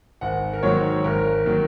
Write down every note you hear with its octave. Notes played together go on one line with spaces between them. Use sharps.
G#1 F#5
A#4
G#2 D#3 F#3 C#5
G#1 A#4
D#3 F#3